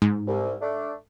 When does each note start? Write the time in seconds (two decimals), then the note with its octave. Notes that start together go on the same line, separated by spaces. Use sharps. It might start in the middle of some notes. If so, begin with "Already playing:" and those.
0.02 G#2
0.27 C2
0.61 A3 D4